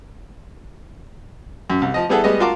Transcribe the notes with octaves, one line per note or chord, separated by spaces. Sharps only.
F#2
C2
F3 D#5
G3 B3 E4 G#4 A4 F#5
G3 G#3 B3 D#5
F4 F#4 A#4 A5 C6 D6